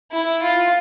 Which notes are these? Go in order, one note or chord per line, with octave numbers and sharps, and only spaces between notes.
E4
F4